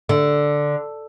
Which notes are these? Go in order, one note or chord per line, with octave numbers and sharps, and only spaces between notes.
D3